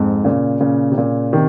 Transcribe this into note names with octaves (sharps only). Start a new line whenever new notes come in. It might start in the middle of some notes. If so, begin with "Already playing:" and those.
Already playing: F2 G#2
A#2 C#3
A#2 C#3
C3
A#2 C#3
C3 D#3